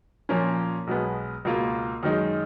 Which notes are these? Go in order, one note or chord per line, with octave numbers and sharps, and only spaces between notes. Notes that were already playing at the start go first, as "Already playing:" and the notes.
A#2 F3 A#3 C#4
B1 B2 G#3 B3
C#2 B2 A#3 F4
F#2 D#3 G#3 D#4